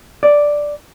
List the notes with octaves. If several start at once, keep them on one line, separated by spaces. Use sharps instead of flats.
D5